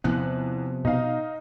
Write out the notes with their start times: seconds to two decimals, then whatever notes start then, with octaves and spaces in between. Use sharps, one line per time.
0.04 E2 C3 F3 B3 F#6
0.85 B2 D#4 F5